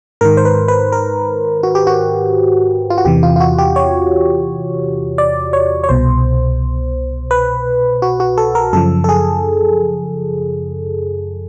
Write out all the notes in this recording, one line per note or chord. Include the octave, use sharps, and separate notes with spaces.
G#2 D#3 A#4
C5
B4
B4
A#4
F#4
G4
F#4
F4
F#4
E2 C3 E3 G4
F4
F4
F#4
G4
C#5
D5
C#5
C#5
C2 B2 C5
B4
F#4
F#4
A4
A#4
F#2 C#3 F3 A4
A4
G#4